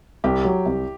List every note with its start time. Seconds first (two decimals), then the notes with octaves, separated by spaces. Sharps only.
0.24 C2 G4
0.45 F#3
0.66 C2